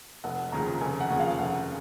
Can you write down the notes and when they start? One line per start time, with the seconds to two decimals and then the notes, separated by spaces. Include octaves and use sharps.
0.24 F1 F#5
0.52 D#2 C#3 F3 A#5
0.81 F1 G#5
1.01 F#5
1.10 D#2 C#3 F3
1.19 F5
1.39 F1 F#5